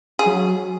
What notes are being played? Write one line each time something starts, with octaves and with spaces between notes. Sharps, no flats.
G#4
F#3